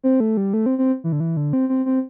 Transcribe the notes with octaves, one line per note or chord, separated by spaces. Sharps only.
C4
A3
G3
A3
C4
C4
E3
D3
E3
D3
C4
C4
C4